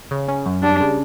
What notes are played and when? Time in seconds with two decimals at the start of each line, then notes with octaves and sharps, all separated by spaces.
0.11 C#3
0.28 C#4
0.46 F#2
0.63 G3 D4
0.80 C#3